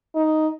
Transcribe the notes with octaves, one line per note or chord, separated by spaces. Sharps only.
D#4